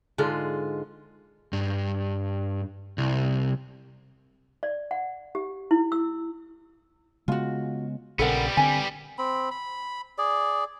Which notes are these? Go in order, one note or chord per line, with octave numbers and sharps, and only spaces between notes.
G#2 D3 G#3 F4
G2
C2
D5
F#5
G4
E4
E6
C#3 G#3 B3 F4 F#4
A#1 C#3 G3 B3 A4 A#4 F#5
D3 C4 G#5
C4 B5
B5
G#4 D5